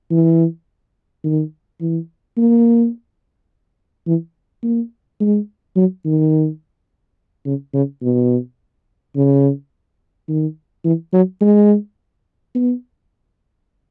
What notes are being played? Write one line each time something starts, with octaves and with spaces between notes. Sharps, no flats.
E3
D#3
E3
A#3
E3
A#3
G#3
F#3
D#3
C#3
C#3
B2
C#3
D#3
E3
F#3
G#3
B3